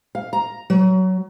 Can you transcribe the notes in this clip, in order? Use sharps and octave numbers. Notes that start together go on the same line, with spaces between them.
F5
A#5
F#3